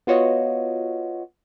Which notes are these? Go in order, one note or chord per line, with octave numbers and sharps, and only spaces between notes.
B3 F4 F#4 C#5 D#5